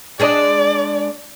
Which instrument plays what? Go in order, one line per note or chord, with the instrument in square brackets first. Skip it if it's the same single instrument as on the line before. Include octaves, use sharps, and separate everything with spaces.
[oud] G#3 D4 D#5 [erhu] D5